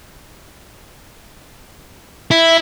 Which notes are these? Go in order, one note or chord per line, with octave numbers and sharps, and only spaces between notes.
E4